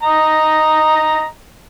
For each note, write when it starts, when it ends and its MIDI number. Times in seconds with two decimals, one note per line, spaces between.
0.03 1.25 75
0.03 1.25 82